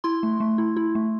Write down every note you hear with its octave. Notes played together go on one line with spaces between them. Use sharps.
E4 C6
A3
A3
E4
E4
A3